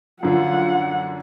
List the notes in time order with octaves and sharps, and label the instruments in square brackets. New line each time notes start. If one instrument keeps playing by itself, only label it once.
[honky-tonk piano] F#2 D3 F3 [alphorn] F4 [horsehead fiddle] F#5